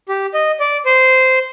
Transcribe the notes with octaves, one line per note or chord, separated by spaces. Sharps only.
G4
D#5
D5
C5